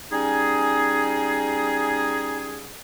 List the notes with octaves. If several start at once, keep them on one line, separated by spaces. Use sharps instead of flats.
G3 C#4 D#4 G#4